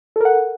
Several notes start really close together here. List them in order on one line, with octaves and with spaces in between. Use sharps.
A4 A#4 F#5